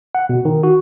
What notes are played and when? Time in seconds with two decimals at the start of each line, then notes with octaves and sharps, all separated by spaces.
0.15 F#5
0.29 B2
0.45 D#3
0.63 F#4